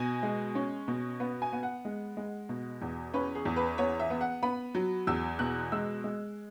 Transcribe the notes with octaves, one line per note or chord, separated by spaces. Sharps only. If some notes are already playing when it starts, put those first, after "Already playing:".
Already playing: B2 G#5
G#3
C#4
B2
B3
G#5
B3
F#5
G#3
G#3
B2
E2
C#4 B4
G#4
E2
B4
B3 C#5
E5
B3
F#5
B3 B5
F#3
E2 E6
B2 F#6
G#3 E6
G#3